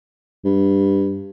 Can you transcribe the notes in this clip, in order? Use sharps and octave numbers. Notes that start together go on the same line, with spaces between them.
G2